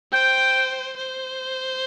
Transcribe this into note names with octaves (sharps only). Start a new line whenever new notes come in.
C5 G5
C5